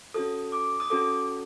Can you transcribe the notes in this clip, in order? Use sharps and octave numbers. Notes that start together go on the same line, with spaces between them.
C#4 F#4 A4 D#6
D6
D#6
C#4 F#4 A4 D6